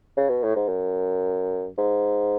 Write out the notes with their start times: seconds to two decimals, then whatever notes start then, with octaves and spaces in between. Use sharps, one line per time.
0.17 C#3
0.29 B2
0.43 A2
0.56 G#2
0.68 F#2
1.78 G#2